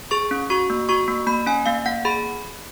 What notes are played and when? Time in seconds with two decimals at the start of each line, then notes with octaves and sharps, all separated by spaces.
0.11 G#4 C#6
0.31 C#4
0.50 F#4 C#6
0.70 A#3
0.89 F#4 C#6
1.08 A#3
1.27 A#3 B5
1.46 C#4 G#5
1.66 A#3 F5
1.86 A#3 F#5
2.05 G#4 B5